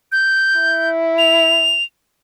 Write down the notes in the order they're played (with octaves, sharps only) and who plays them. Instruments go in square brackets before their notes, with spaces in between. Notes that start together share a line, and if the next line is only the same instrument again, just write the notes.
[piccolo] G6
[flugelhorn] E4
[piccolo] F7